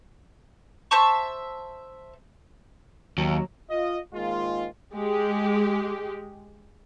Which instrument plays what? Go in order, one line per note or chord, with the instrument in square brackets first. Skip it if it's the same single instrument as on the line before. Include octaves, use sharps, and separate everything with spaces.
[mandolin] C5 E5 A5 C#6
[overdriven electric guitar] D#2 [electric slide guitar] F#3
[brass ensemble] F4 D#5
G#2 D#3 G#3 A#3 F4
[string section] G#3 G4